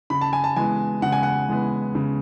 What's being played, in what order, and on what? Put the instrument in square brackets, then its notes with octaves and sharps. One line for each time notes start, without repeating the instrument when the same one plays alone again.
[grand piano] C#3 B5
A5
G#5
A5
E3 G#3 B3 G#5
C#3 F#5
G#5
F#5
E3 G#3 B3
C#3